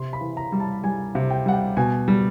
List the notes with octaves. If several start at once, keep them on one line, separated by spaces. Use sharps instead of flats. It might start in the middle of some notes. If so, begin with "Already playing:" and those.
Already playing: C3 C6
B5
E3
A#5
G3
A5
G3 G#5
C3
G5
G3 F#5
G5
B2 G#5
G3